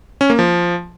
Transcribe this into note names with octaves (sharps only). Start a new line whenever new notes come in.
C#4
A#3
F3